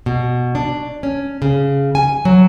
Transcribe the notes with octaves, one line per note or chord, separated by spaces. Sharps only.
B2
D4
C#4
C#3
G#5
F#3